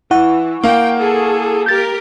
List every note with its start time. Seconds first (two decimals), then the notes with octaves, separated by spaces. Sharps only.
0.11 E3 E4 F#5 C#6
0.63 A#3 F5 G5
0.98 G#4 A4
1.66 G4 A#4 G6 A6